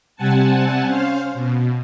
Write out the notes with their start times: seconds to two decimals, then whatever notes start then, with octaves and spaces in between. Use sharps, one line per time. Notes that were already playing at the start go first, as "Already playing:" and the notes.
0.16 C3 G3 C4 F#5 G#5 A5
0.85 C#4 C5 F5
1.33 B2